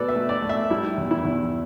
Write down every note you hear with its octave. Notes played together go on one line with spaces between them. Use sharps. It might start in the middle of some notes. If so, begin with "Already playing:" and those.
Already playing: B2 A3 A4 B4 D5
E5
A3
D5
A3
E5
G3 E4
E2
E4
E2